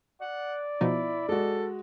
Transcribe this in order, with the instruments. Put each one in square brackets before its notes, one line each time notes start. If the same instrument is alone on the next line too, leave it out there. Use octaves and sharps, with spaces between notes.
[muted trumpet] D5 [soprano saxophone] F#5
[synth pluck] B2 F3 D#4 [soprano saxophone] E4
[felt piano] G#3 F#4 [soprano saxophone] A4